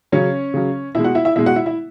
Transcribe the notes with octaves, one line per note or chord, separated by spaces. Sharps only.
C#3 F#3 C#4 C#5
C#3 F#3
B2 G#3 E4 E5
F#4 F#5
E4 E5
E4 E5
B2 G#3 E4 E5
F#4 F#5
E4 E5
E4 E5